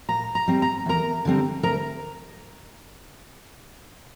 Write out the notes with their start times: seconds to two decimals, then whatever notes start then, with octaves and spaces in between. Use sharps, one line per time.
0.09 A#2 A#5
0.35 A#5
0.48 G3 C4
0.62 A#5
0.86 E2 A#4 A#5
1.25 D3 G3 C4
1.63 D2 A#4 A#5